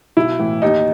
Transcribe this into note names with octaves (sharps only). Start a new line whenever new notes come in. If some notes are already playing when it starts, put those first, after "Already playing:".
B1 E4
A2 E3
D#2 D#4